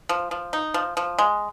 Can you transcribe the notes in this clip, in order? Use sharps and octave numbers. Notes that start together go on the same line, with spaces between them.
F3
F3
D#4
F3
F3
G#3